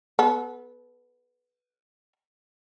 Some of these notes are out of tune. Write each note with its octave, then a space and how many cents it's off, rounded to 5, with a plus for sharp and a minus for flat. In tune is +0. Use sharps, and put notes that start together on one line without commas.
B3 +0 A4 -40